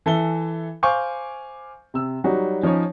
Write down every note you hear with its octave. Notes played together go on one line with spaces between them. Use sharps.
E3 A4 E5 G7
C5 F5 G#5 C#6 D6 G6
C3 E6
F#3 G3 D#4 F#4
F3 C#4 D#4 C#5